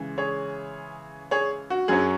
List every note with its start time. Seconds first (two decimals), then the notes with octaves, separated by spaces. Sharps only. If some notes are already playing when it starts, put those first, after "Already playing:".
Already playing: C#3 E3 G#3
0.18 G#4 C#5
1.31 G#4 C#5
1.70 F#4
1.88 F#2 F#3 C#4 G#4